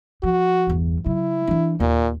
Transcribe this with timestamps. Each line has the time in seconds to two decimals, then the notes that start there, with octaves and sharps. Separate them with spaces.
0.23 F3 F#4
0.67 G1 E2
1.06 C#3 F#3 E4
1.47 E3 D4
1.80 D#2 A#2